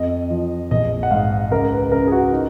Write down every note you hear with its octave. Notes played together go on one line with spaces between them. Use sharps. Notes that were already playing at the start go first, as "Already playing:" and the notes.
Already playing: F2 D#5
F3
A#1 D#5
F#5
G#2 F5
C#2 A#4
B4
C#3 A#4
G#4
F#4
D#4